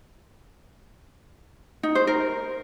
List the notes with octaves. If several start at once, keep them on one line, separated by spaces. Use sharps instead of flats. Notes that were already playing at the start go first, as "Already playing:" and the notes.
D#4
C5
A#4